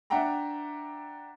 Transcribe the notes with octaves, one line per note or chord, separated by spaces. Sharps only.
D4 E5 F#5 G5 A#5